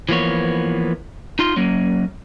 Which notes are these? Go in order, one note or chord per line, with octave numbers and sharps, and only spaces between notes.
E3 F3 A#3 B3 C#5
D#4 F4 C6
F#3 A#3 C#4